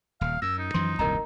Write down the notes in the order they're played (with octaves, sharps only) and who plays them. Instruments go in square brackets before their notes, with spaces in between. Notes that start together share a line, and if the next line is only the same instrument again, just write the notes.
[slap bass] D#1 [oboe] F5
[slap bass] F#2 [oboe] E6 [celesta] A#6
[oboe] D#4
[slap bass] F#2 E3 F3 [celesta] C6
[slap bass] D#1 C2 F#2 [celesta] A#4 D#5 A#5